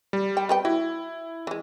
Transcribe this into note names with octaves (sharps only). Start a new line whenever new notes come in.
G3
G5
G3 B4 G5
E4 F#4
E3 G#3